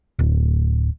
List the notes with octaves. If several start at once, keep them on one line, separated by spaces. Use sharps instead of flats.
D1